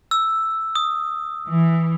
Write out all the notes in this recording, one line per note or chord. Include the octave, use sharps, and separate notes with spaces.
E6
D#6
E3